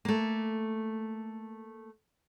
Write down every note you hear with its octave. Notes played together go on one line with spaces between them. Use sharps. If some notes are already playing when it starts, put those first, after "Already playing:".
A3 A#3